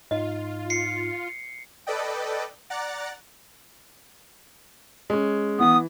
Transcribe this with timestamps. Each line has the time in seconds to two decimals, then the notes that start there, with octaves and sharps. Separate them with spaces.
0.11 G#2 D#4 F4 D#5
0.70 C7 C#7
1.87 A4 B4 D5 D#5 G5
2.70 D5 F#5 A#5 F#6 A6
5.10 G#3 C#4
5.60 E3 B3 D#6